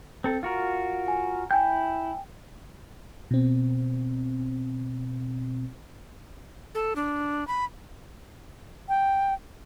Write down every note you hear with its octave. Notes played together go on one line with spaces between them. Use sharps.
C4 A4
F4 F#4 A#4
G#5
E4 G5 G#5 G6
B2 C4
A4
D4
B5
G5